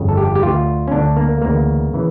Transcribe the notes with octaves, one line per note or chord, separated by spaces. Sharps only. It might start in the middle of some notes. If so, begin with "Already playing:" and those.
Already playing: G1 F2 C#3
A4
G4
G4
D2 D3 F4
C#4
D2 D3 D4
A#3
D2 C#3 E3 A#3
C#3 E3